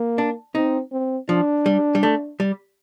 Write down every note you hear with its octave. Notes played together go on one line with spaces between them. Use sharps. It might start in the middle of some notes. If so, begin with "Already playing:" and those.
Already playing: A#3
D4
C4 D#4
C4
F3 D4
G3
G3
A3
G3